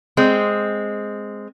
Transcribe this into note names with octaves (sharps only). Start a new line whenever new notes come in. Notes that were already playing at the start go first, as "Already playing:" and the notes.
G#3 C4